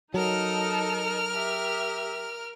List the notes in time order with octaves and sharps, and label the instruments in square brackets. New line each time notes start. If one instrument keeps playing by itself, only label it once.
[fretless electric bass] F#3 [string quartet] D#4 A4 D#5 [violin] A#4 F6
[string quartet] G4 E5